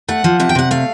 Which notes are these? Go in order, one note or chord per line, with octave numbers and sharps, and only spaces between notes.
A3 F#5
F3
C3 F#5
G5
C3 F#5
A3 F5